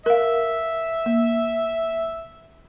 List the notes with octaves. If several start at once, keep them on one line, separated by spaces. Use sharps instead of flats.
A#4 E5 F5
A#3